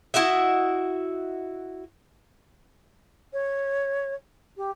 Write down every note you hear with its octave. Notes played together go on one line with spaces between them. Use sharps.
E4 F#4 D#5 E5
C#5
G4